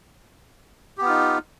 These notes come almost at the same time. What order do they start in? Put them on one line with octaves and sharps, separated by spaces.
G4 B3 F4 D#4